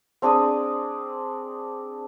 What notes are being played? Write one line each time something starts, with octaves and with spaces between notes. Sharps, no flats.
C4 D4 G#4 D#6